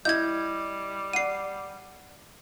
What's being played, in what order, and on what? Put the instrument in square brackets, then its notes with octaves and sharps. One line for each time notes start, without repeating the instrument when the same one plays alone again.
[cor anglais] G3 [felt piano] E4 D#5 [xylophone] G6 G#6
[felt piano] D5 F#5 [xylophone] C7 D#7